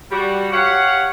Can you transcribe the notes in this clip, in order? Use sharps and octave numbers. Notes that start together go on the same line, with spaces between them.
G3 F#4
G4 C#5 F5 F#5